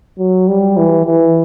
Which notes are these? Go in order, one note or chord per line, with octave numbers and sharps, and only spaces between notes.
F#3
G3
E3
E3